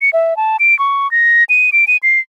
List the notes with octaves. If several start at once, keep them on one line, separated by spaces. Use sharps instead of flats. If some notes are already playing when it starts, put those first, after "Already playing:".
C#7
E5
A5
D7
C#6
A#6
D#7
D7
D#7
C7